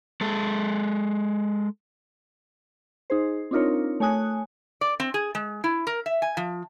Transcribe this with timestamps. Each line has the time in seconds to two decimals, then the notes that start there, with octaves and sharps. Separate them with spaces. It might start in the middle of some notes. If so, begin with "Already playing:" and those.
0.21 G#3 A4
3.10 D#4 G#4 C5
3.51 C4 D4 D#4 F4 A#4 C#5
4.00 A3 C#5 G#5 D#6 F#6
4.81 D5
5.00 C4
5.14 G#4
5.35 G#3
5.64 E4
5.87 A#4
6.06 E5
6.22 G#5
6.37 F3